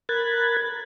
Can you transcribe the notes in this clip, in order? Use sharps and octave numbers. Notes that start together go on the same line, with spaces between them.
A#4 B5 F#6 G#6 A6